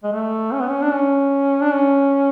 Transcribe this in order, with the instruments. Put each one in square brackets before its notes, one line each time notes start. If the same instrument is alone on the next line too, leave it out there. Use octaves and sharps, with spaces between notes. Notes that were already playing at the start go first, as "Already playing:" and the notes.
[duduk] G#3
A3
C#4
B3
C#4
D4
C#4
D4
C#4